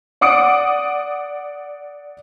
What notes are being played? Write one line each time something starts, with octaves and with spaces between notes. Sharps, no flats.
D5 F#5 D6 D#6 C#7 D7